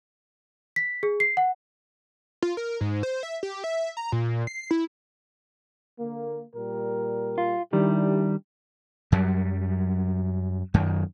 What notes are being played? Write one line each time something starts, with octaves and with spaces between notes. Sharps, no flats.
B6
G#4
C7
F#5
F4
A#4
G#2
C5
E5
G4
E5
A#5
A#2
C7
E4
D3 A#3
A#2 G3 A#4
F4
D#3 G3 D4 E4 G4
F#2 F#3 G3
F#2 D#3